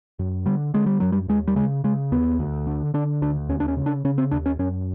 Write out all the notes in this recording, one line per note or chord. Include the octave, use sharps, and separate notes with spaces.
F#2
D3 G3
D3 G#3
G3
F#2 F#3
G3
D#2 G#3
G3
C#3 G#3
C#3 G#3
D#2 B3
D2
D3
D3 D4
D2 D4
D#2 C#4
D4
C#4
C#3
D4
C#3 C#4
C4
D#2 D4
C#4
F#2 C#4